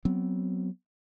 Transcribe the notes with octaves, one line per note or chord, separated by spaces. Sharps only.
F#3 B3 C4